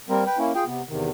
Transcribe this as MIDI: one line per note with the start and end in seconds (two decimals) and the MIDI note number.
0.09 0.24 55
0.09 0.24 58
0.09 0.24 60
0.09 0.24 70
0.26 0.38 71
0.26 0.38 79
0.38 0.53 58
0.38 0.53 61
0.38 0.53 64
0.55 0.64 65
0.55 0.64 68
0.55 0.64 79
0.67 0.82 48
0.67 0.82 59
0.89 1.11 40
0.89 1.11 48
0.89 1.11 51